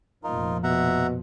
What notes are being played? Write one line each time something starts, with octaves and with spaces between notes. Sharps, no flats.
F1 A#2 F3 D#4 F4 A#4
B2 E5 F#5 A#5